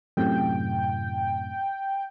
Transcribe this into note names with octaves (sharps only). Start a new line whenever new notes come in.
F#2 A2 C3 G5